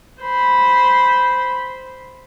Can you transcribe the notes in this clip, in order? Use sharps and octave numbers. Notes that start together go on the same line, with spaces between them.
C5 B5